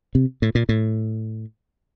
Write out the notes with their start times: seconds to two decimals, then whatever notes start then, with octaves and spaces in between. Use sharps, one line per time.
0.15 C3
0.42 A2
0.55 A#2
0.69 A2